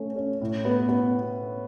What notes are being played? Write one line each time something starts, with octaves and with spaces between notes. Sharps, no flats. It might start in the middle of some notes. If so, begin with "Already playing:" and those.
Already playing: A3 C#4
C#4
A2
B3
B3